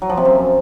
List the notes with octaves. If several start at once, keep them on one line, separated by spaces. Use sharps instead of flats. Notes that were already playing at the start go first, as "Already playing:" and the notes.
F#3
F3
C3
F#2